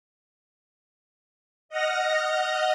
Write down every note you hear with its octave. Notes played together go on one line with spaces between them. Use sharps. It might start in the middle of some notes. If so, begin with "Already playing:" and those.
D#5 F#5 F6 A#6